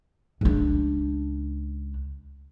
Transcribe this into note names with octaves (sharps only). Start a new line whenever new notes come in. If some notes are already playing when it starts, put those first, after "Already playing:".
C#2 D4